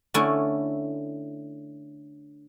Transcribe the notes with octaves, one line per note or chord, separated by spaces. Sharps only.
D3 A3 C#4 E4